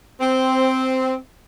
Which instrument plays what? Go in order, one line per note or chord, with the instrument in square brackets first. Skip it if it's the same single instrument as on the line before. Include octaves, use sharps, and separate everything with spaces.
[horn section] C4